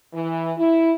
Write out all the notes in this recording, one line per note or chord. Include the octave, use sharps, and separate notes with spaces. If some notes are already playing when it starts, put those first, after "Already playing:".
E3
E4